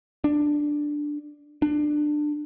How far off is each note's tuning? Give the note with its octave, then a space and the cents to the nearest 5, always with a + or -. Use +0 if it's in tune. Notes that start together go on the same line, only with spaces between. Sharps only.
D4 +5
D4 +20